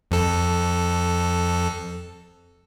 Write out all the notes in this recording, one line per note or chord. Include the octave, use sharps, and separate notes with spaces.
F2 A4